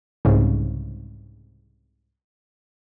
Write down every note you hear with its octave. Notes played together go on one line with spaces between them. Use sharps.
C2 G#2 C#3